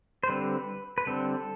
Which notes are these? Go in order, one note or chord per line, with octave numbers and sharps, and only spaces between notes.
C5
D3 G3 C4 B4
B4
D3 G3 C4 A4